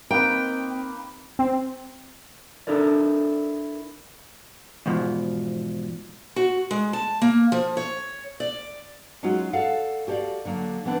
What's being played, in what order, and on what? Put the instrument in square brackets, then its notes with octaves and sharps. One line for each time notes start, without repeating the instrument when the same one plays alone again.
[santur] A#3 D#4 B4 [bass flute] C4 [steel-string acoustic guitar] G5
[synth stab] C4
[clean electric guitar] D4 E4 A4 A#4 D5
[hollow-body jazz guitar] E2 G#2 B2 F3
[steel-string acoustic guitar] F#4
G#3
A5
A#3
F3
C#5
D5
[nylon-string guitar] F#3 G#3 C#4 D#4 F4 F#4
A4 D5 F5 F#5
F#4 G4 A4 C#5 D5 F5
D3 F#3 A#3
E3 B3 C4 D4